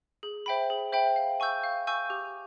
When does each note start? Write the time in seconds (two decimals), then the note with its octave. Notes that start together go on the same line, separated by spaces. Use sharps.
0.23 G#4
0.46 C5 E5 G5 B5
0.70 G#4
0.92 C5 E5 G5 B5
1.16 F5
1.40 G#5 C#6 E6 G6
1.63 F5
1.87 G#5 C#6 E6 G6
2.10 G4